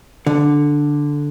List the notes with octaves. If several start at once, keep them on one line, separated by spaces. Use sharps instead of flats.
D3